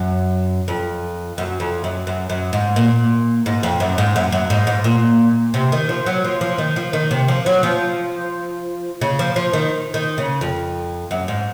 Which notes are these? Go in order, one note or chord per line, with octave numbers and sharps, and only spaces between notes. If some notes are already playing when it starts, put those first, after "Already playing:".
Already playing: F#2
F2
F#2
F2
F#2
F#2
F#2
G#2
A#2
G#2
F2
F#2
G#2
F#2
F#2
G#2
G#2
A#2
C3
D#3
F3
F#3
F3
F3
D#3
F3
D#3
C3
F3
F#3
F3
C#3
F3
F3
D#3
D#3
C#3
F2
F#2
G#2